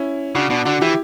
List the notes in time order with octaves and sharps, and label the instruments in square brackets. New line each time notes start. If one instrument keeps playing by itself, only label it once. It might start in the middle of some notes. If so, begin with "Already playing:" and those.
Already playing: [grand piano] C#4 E4
[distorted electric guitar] C#3 [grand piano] D4 F#4
[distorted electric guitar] B2 [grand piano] D4 F#4
[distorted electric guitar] D3 [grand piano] D4 F#4
[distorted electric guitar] E3 [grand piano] E4 G4